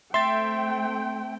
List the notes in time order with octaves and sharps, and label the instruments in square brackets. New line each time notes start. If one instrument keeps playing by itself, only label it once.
[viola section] A3 C4 G5 [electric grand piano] E5 A6 [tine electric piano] C6